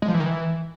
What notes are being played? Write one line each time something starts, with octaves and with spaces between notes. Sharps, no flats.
G#3
F3
E3
D#3
E3